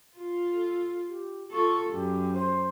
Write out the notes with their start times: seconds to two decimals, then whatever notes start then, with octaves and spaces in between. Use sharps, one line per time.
0.17 F4
0.51 A4
1.09 G4
1.51 F4 A4 C#6
1.90 F#2 G4
2.34 C5